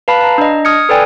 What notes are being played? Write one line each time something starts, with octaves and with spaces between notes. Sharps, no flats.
B4 F5 A5 B5
A5 A#5
D4 D#5
D#6 F6 G#6 C#7
A4 B4 D5 G5 G#5